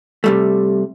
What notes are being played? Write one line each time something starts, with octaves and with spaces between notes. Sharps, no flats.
C3 G3 A3